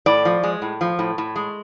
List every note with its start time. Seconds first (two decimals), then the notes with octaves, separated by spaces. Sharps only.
0.06 A2 D5
0.25 F3
0.43 G#3
0.62 A2
0.81 F3
0.99 A2
1.18 A2
1.36 G#3